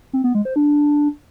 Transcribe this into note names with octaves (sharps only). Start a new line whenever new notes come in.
C4
B3
G#3
C5
D4